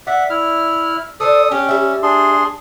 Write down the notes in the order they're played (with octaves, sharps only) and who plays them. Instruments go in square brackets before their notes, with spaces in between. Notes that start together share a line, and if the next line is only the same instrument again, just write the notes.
[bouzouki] D5 [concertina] E5 F#5
[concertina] E4 F6
[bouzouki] D4 C5 D5 [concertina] A4 D#6
[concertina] C#4 [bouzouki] D4 G4
[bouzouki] G3 E5
[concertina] D4 G#4 C6